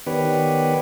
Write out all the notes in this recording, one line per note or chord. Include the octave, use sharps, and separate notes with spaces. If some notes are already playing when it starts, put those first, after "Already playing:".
D#3 B3 G4 B4 C#5 D5